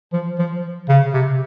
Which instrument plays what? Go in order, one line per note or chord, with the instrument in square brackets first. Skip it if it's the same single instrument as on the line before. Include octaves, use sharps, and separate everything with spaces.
[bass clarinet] F3
F3
C#3
C3